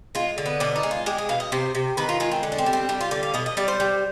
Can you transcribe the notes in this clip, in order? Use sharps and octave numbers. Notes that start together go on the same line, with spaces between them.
G#3 F4
D3
B3
B2 D4
D#4
G#3
F4
G#3 G4
G#4
B2 F5
D#5
C3 C5
C3
D#3 B4
F4
G#3 F4
C4
D3
D4
C4
G3
C4
G3 D4
F4
D3 D5
F5
B2 D#5
D#5
G3 D5
C5
G3